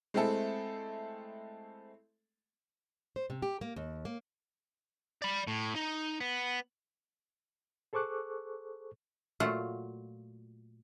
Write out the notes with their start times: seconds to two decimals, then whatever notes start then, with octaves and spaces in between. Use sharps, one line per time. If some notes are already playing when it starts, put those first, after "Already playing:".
0.14 G#3 A3 C4 E4 A4
3.16 C5
3.30 C3
3.42 G4
3.61 A#3
3.76 D#2
4.05 A#3
5.22 D5 B5
5.47 A2
5.76 D#4
6.20 B3
7.93 G#4 A4 C5 C#6 D6 F#6
9.40 A#2 F#3 A3 F4 F#5